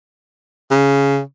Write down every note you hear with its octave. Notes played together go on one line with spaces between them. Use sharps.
C#3